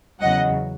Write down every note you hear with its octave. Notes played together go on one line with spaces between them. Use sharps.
E2 C#3 F#3 D#5 F#5